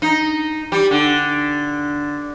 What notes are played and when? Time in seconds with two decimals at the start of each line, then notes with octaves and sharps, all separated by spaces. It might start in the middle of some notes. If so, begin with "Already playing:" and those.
0.02 D#4
0.72 G3
0.91 D3